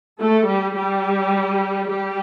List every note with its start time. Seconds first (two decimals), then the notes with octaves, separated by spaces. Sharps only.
0.20 A3 A4
0.48 G3 G4
0.76 G3 G4
1.88 G3 G4